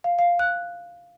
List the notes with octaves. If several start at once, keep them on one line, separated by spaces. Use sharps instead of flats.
F5
F5
F#6